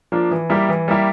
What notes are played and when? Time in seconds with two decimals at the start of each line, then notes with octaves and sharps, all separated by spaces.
0.12 F3 A#3 D4
0.31 E3
0.49 G3 A#3 E4 G4
0.69 E3
0.88 G3 A#3 E4 G4